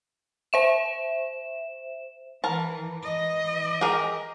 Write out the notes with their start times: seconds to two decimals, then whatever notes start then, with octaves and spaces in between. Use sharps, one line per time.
0.53 C5 E5 E7
2.44 E3 A#4 A5
3.03 E3 D#5
3.81 G4 G#4 A#4